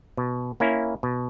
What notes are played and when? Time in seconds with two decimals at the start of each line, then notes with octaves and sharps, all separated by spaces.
0.17 B2
0.60 A#3 C#4 E4
1.03 B2